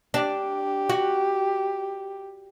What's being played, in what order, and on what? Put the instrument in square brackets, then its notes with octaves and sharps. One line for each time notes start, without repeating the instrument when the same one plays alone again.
[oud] D4 [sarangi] G4
[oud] F#4